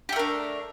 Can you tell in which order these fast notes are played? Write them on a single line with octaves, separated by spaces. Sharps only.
G4 A3 A#4 D4